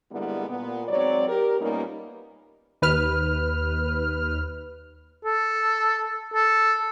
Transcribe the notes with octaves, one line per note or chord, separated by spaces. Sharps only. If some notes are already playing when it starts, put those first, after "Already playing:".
D3 G3 G#3 A#3 B3 E4
A#2 B3
G#2 F#3 C4 C#5 D5
G4 A#4
A#2 G3 A#3 B3 C#4 D#4
D#2 B4 F6
A4
A4